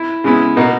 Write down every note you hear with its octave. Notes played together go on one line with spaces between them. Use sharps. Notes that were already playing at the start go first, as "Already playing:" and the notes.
Already playing: E4
C#3 G#3 B3 E4
B2 A#3 D#4 F#4